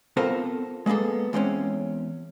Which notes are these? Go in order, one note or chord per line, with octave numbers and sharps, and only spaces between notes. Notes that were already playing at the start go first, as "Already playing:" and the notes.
B3 C4 F4 A4 A#4 C5
G#3 A#3 B3 G#4 A4
E2 G#3 C4 C#4